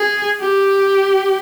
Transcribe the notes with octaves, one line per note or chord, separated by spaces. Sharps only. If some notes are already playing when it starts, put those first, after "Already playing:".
Already playing: G#4
G4